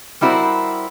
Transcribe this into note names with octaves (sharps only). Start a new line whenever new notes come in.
G3 C4 E4 F#4 A#4 C5